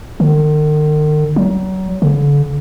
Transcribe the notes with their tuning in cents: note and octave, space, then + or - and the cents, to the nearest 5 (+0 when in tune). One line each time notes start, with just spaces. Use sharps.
D#3 -45
F#3 +30
D3 -40